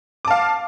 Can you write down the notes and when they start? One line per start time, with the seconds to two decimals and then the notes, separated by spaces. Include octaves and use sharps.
0.25 D6
0.28 A5
0.30 F5